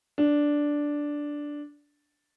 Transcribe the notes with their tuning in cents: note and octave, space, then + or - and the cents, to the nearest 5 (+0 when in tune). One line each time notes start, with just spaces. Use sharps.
D4 -5